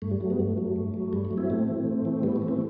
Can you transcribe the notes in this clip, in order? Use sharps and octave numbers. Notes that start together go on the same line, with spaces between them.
G2 A3
G3
F#3 A3
G3 B3
G2 A3
F#3
G2
F#3
G2 G3
A3
F#3
C4 E4
A2 A3 C4
E3
A2
E3
A2 G3 B3
A3
E3
A3 C4